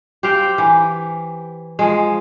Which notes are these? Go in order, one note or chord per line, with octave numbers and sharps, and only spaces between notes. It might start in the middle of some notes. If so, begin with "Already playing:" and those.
G4 C5 F5 G5
E3
F3 G#3